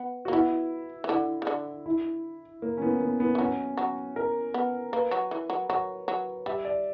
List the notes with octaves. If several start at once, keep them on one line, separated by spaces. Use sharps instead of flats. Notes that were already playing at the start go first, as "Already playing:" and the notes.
Already playing: B3
F#4
A#3
B3 E4
E3
D3 E4
C#3
D3
E4
A#3
C#4
B3
B3
B3
E3
F#3 C#4
F#3
A#4
B3
A#3 B4
F#3
E3
F#3
F#3 C#5
F#3
G3 E5
D5